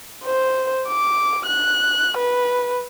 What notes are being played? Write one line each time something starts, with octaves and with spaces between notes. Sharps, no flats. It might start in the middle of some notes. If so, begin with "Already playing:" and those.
C5
D6
F#6
B4